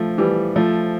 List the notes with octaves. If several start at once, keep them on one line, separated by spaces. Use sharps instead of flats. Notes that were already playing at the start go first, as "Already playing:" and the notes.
Already playing: F3 A3
E3 G3
F3 A3